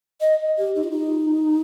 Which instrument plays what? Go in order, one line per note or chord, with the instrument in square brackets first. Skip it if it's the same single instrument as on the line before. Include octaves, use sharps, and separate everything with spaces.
[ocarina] D#5
G4
D#4
F4
D#4